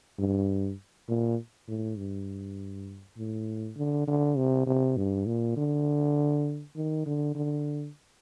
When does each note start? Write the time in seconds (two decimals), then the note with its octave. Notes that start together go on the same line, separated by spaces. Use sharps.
0.19 G2
1.09 A#2
1.68 A2
1.98 G2
3.18 A2
3.77 D3
4.07 D3
4.37 C3
4.66 C3
4.97 G2
5.26 A#2
5.57 D3
6.75 D#3
7.06 D3
7.35 D3